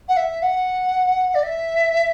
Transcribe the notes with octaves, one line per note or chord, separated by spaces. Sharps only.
F#5
E5
F#5
D5
E5